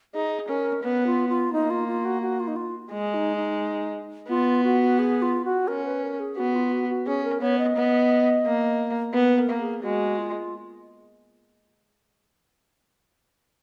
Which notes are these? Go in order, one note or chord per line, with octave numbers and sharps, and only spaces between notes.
D#4 G#4
C#4 A#4
B3 B4
F4
F4
A#3 D#4
F4
F4
F#4
F#4
F4
D#4
F4
G#3 G#4
D#4
D#4
B3 F4
F#4
G#4
F4
F#4
C#4 A#4
B4
A#4
G#4
B3 F#4
F4
F#4
F#4
C#4 G#4
A#4
B3 C#5
D#5
B3
A#3
B3 B4
A#4
A#3
G#4
G#3 F#4
F4